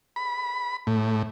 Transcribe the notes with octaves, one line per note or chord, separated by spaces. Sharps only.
B5
A2